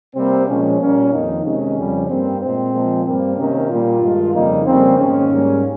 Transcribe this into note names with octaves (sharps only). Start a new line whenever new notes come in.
C3 G3 A#3 C4
A#2 F3 G#3 C#4
A#2 G3 A#3 C#4
F2 D#3 A#3 D#4
C3 D#3 G#3 C#4
F2 C#3 G3
G2 G3 A#3 C4
A#2 G#3 C4
A#2 F3 G#3
G2 G3 A#3 C4
C3 D#3 A#3 C#4
A#2 G3 A#3 F4
G2 D#3 G#3
F2 C#3 G3 A#3 D#4
F2 C#3 G3 A#3 C4
G#2 D#3 A#3 C#4
G#2 G3 A#3